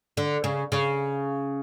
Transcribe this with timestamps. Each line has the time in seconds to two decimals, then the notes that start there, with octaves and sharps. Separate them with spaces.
0.17 D3
0.44 C#3
0.72 C#3